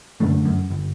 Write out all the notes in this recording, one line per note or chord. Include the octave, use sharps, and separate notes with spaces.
F#1 F#2 D3 A3
F#2
G1